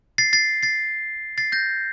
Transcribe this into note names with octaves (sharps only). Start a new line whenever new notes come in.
A6 C7
A6 C7
A6 C7
A6 C7
G6 A#6